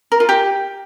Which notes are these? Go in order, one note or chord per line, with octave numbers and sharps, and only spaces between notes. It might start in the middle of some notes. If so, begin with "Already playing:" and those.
A#4
F4
G4